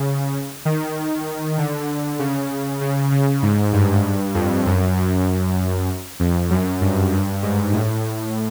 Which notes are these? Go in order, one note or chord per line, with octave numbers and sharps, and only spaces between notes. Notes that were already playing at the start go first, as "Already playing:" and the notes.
Already playing: C#3
D#3
D3
C#3
C#3
C#3
G#2
G2
F2
F#2
F#2
F2
F#2
G2
G2
G#2
A2